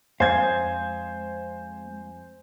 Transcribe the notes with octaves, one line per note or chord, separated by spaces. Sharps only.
F2 G#3 C5 F5 G#5 G#6